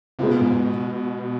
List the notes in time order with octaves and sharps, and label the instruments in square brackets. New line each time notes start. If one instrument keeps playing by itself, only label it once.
[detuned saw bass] C3 [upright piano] G#3 B3 F4
[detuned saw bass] B2
G#2
B2